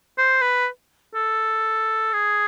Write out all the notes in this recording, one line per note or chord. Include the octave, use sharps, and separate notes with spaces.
C5
B4
A4
G#4